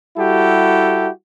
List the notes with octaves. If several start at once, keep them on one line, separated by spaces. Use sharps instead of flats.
G3 E4 F#4 G4 A4